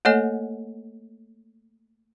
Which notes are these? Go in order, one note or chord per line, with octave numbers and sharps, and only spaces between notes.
A3 A#3 A4 C#5 D#5 G#5